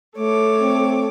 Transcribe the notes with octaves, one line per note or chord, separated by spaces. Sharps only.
A3 A4 C#5 D6
C4